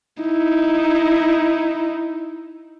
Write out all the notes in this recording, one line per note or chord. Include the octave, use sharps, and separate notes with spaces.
D#4 E4